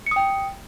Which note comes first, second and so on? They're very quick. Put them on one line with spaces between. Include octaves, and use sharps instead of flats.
C#7 D#6 G5